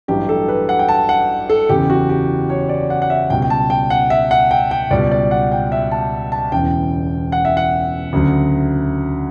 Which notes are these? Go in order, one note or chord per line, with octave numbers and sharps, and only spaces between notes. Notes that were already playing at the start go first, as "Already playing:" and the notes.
A1 G2 F#3 G4
A4
B4
F#5
G5
A5
F#5
A4
F#1 E2 C#3 G4
F#4
G4
C#5
D5
F#5
F#5
E5
C#2 B2 G3 G5
G5
A5
G5
F#5
E5
F#5
G5
G5
C#2 B2 G3 D5
D5
F#5
G5
E5
A5
A5
E1 E2 C#3 G5
F#5
E5
F#5
D2 C#3 F#3